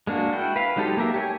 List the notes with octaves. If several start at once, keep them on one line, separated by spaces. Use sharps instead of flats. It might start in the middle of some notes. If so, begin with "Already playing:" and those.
G#3 A#3 D4 F#4
E4 F#4 G5
B4 F5
F#3 G#3 D#4 G4 A4
A#3 G4 A#4 E5
G4 C#5 G#5